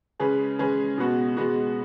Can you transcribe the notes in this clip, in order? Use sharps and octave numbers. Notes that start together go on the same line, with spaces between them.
C#3 G#3 C#4 G#4 B4
C#3 G#3 C#4 G#4 B4
B2 G#3 B3 F#4
B2 G#3 B3 F#4